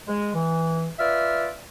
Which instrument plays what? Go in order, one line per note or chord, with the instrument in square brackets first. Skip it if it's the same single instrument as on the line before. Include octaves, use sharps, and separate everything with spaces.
[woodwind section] G#3
E3
F4 B4 D5 E5 F6